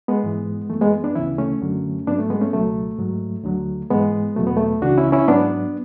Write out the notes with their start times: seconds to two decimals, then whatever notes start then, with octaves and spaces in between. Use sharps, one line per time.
0.08 G#3 B3
0.24 G#2 E3
0.70 F#2 E3 A3
0.81 G#3 B3
1.04 B3 D4
1.15 D2 C#3 E3 C#4 E4
1.38 A3 C#4
1.62 F#2 D3 F#3
2.07 G#2 F#3 B3 D4
2.19 A3
2.30 G#3 B3
2.41 A3 C#4
2.53 C#2 B2 F#3 A3
2.99 G#2 F#3
3.44 D2 D3 F#3
3.90 G#2 E3 G#3 B3
4.36 E2 B2 F#3 A3
4.47 B3
4.57 A3
4.82 C#2 C#3 E3 D4 F#4
4.98 C#4 E4
5.12 C#4 E4
5.28 G#2 F#3 B3 D4